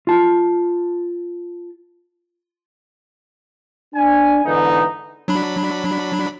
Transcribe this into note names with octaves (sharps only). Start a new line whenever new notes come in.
F4 A5
D4 G#5
G#2 D3 E3 B3 D#4
F#3 D4 B5